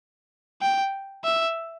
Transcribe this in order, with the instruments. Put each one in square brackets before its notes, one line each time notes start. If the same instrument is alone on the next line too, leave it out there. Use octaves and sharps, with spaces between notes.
[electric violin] G5
E5